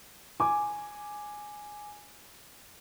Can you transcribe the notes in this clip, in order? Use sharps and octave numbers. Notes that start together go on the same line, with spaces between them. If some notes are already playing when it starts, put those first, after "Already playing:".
G#5 D6